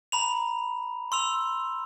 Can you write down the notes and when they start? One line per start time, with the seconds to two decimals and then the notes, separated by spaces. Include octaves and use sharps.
0.12 A#5 B5 F7
1.12 C6 E6 F7